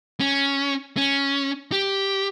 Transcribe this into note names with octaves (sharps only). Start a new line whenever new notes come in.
C#4
C#4
G4